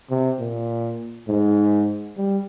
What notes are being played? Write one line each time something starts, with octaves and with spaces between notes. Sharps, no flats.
C3
A#2
G#2
G3